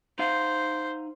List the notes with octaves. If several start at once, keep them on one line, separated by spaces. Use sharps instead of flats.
D#4 C5 F5 F#5